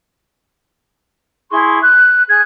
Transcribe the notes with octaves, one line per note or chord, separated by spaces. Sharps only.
E4 G#4 C6 C#6
F#6
G#4 F#6 G#6